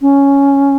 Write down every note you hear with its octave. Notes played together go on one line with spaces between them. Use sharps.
C#4